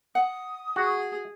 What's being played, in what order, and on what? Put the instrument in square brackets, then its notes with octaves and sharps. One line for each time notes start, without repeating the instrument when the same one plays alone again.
[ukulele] F#5 [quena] D#6
[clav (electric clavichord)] F#4 [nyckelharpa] G#4